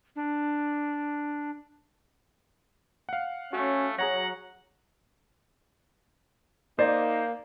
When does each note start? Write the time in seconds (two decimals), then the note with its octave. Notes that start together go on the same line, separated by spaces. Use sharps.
0.16 D4
3.09 F5 F#5
3.53 A3 C#4 F#4
3.99 F#3 G#4 C#5 F#5 A#5 A#6
6.79 A#3 D#4 C5 D5